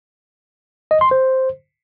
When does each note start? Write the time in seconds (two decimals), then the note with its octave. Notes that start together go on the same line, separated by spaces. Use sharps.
0.91 D#5
1.01 C6
1.11 C5